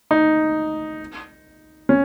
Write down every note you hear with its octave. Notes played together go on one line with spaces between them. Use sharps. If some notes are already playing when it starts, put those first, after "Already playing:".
D#4
C#4